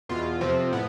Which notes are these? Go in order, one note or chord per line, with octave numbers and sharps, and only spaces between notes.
E2 B2 F4
F2 C3 F3 C4
A2 B3